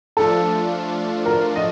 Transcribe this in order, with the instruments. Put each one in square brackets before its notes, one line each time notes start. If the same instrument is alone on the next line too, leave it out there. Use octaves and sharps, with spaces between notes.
[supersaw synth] F3 A3 D4 F4 [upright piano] A4
[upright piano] A#4
D#5